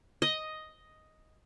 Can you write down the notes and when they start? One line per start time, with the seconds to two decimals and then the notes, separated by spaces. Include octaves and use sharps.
0.22 D#5